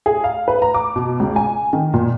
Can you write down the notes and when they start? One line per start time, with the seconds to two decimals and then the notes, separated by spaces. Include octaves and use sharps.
0.06 G#4
0.24 F5
0.48 B4
0.62 A#5
0.74 D6
0.96 B2
1.20 C#2
1.36 G#5
1.73 D#3
1.94 A#2